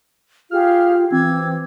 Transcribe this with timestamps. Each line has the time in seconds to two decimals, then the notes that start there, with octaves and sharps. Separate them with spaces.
0.51 F4 G4 G#4 F5 F6
1.12 E3 C4 D6 E6 G#6